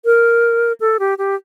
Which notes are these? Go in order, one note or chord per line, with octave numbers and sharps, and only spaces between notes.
A#4
A4
G4
G4